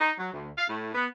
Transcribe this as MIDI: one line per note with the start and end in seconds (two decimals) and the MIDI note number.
0.01 0.14 63
0.19 0.28 54
0.33 0.50 38
0.58 0.65 77
0.70 0.92 45
0.94 1.07 59